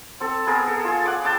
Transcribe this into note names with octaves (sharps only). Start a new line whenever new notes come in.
C4 A4
B3 G#4 A#4
A4
F4 G#4
F#5 D6
G5 A5 D6 E6